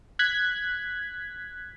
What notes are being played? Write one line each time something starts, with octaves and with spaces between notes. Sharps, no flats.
F#6 G#6 B6